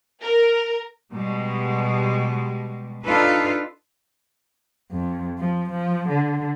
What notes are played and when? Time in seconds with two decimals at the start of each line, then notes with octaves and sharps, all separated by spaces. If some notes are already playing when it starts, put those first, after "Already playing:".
0.22 A#4
1.12 B2 G3 G#3
3.04 D4 D#4 F4 A4 B4
4.91 F2
5.38 F3
5.70 F3
6.09 D3